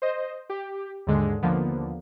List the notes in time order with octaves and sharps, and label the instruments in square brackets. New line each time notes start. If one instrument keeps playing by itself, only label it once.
[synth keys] C5 D#5
G4
D#2 G#2 D3 G#3
D#2 D3 F3 A#3 B3